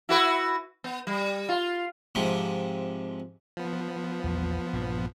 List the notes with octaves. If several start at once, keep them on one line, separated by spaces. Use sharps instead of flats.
E4 F#4 B4
B3
G3
F4
G#2 C3 F3
F3 B3
A#1 E2 G3
A#1 G2 A#2